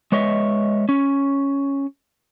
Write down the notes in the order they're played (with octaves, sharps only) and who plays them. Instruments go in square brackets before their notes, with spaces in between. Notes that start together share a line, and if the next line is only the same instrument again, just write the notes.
[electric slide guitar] G#3 B4 C#5 D#5 E5
C#4